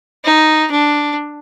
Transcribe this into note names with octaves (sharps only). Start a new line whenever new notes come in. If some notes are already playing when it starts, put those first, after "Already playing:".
D#4
D4